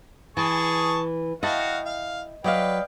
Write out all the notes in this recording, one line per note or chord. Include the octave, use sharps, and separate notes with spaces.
E3 G#4 A5 C#6
E4 F#4 D#5 F5 G5 A5
F5
F#3 B4 D5 D#5 F5 G5